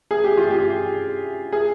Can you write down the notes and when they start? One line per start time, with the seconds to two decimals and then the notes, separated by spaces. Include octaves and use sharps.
0.11 G#4
0.24 G4
0.37 F4
0.51 G4
1.52 G#4